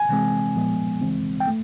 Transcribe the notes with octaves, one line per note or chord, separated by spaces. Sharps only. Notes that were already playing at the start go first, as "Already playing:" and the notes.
Already playing: G#5
C3 E3 G#3 C4
A#2 F3 G#3 B3
D2 C#3 E3 G#3 C4
G5
A3